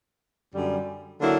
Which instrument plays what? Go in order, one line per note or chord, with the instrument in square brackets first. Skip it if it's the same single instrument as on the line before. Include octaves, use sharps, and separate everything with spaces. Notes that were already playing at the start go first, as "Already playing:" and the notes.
[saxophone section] F#2 D3 G3
D3 F#3 A#3 E4